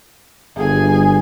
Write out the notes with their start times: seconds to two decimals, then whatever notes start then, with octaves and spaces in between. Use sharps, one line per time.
0.57 G1 G#4 G#5